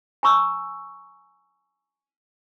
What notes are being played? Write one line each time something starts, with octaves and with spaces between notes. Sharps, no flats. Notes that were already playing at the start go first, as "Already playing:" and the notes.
G#5 A#5 C#6 E6